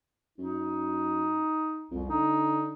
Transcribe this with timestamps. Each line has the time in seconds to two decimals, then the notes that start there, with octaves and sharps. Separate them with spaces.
0.38 F#2 D#4
1.91 C2 F2
2.10 D3 D#4